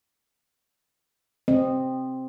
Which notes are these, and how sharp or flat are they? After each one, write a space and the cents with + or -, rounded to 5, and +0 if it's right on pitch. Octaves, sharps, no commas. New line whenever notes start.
C4 +0 D#5 -15